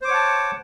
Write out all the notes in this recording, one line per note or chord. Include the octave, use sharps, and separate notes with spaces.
C5 C#5 F#5 A5 D6